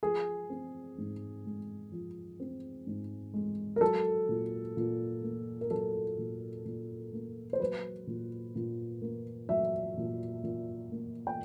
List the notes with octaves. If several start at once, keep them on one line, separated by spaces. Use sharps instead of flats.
F3 G#4
C4
G#2
G#3
F3
C4
G#2
G#3
A#4
F#3 A4
A#2
A#2
A#3
A#4
F#3 A4
A#2
A#2
A#3
C5
F#3 B4
A#2
A#2
A#3
F#3 E5
A#2
A#2
A#3
G5